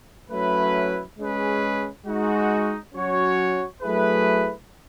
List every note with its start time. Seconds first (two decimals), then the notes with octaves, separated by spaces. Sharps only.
0.30 F#3 A3 C#4 E4 B4
1.19 G#3 C#4 G#4 B4
2.06 G#3 D#4 F#4
2.94 F#3 C#4 F#4 C#5
3.81 F#3 A3 E4 G#4 B4